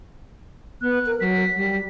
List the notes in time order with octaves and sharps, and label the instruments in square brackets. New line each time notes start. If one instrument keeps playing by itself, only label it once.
[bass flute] B3 [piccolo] F#6
[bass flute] A#4
[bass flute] F#3 [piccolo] B6
[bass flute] G3